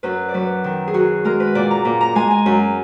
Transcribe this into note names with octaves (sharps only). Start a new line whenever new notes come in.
F#2 B4
D5
F#3 B4
D#3
G#4
F#2 F#4
G#3 A#4
B4
A#2 D5
A#5
A#2
A#5
G#3 G#5
G#5
F#2